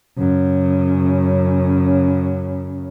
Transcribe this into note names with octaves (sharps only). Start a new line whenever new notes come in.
F#2 C#3